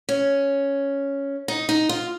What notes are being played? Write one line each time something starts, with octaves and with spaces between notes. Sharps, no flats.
C#4
D#4
D#4
F4